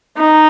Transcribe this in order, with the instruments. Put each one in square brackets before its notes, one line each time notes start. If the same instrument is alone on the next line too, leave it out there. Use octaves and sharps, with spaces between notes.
[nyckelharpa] D#4